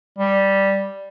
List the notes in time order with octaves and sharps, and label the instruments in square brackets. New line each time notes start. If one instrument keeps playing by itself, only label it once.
[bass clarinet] G3